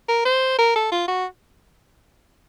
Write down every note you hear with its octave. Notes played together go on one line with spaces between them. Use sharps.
A#4
C5
A#4
A4
F4
F#4